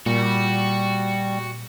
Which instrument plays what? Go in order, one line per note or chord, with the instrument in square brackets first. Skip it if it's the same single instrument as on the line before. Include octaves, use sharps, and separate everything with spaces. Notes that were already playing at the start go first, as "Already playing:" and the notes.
[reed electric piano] A#2 [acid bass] G3 [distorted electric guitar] F#4